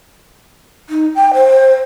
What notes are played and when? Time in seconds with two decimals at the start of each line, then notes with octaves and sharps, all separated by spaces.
0.89 D#4
1.15 G5
1.34 C5